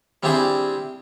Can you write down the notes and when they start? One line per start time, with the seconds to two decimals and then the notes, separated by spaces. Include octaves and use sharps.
0.23 G3 C4 D4 E4 G#4 C5